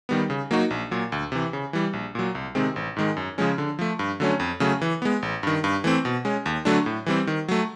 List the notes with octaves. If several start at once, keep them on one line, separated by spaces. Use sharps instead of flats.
D#3 G3 B3
C#3
F#3 A#3 D#4 F#4
A#1
A#2 F#3
D2
C3 E3
C#3
E3 G3
A#1
A#2 F#3
C2
C3 D#3 G#3 C4
A1
G#2 D#3 G#3
F#2
C#3 F3 G#3 C#4
D3
F3 A3
G2
D3 F#3 A3 C#4
F2
C#3 F#3 A3 C#4
E3
G#3 B3
A1
G2 D#3
G2
E3 A3 C4
B2
G#3 C#4
D#2
D3 F#3 A3 D4
A2
E3 G3 C4
D#3
F#3 A3